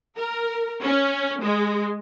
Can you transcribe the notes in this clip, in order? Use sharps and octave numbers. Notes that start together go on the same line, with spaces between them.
A#4
C#4
G#3